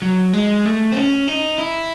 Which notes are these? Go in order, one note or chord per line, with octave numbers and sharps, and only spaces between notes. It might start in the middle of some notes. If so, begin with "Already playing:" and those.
F#3
G#3
A3
C4
C#4
D#4
E4